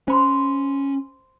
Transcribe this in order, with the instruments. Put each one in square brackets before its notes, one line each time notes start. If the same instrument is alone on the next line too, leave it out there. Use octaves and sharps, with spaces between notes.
[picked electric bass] C#4 [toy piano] C5 B5 C6